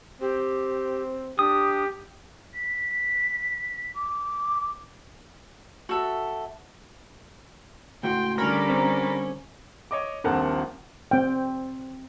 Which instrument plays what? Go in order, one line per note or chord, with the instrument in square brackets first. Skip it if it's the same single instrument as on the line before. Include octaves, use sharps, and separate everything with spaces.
[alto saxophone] C4 [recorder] G4
[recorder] D4 [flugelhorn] G4 [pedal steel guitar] D#6
[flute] B6
D6
[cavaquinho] F#4 A4 E5
[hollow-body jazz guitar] C#2 A2 F#4 [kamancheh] G5 C6
[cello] D3 G3 [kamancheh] C#4 [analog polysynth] A#4 B5 A6
[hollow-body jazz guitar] C4
[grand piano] C#5 D#5 D6
D#1 A#1 C4 A#4 F#5 A5
[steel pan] C4 G5